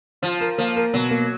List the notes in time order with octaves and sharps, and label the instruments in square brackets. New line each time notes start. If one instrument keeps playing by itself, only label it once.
[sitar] F3 [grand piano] F4
[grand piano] A#4
[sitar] F3 [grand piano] A#3
[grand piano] A#4
[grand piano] B2 [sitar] F#3
[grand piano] A#3